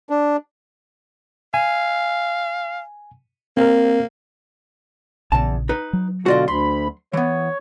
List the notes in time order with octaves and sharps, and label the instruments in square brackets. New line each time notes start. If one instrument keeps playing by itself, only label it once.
[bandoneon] D4
[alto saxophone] F5 [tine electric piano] G#5
[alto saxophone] A#3 [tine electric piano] C4 A#4
[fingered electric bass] A#1 A#2 C#3 [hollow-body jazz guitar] E2 A5
[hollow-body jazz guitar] D#4 B4
[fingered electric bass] F#3
[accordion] B2 D3 F4 [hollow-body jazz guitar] F#4 D5 D#5
[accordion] D2 B5 [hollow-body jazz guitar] C6
[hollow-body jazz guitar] E3 B3 [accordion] C#5